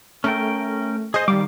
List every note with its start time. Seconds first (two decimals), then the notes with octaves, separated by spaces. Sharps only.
0.24 A3 C#4 A#4 G5
1.14 G#4 C5 D#5
1.28 D#3 G3 F5 D6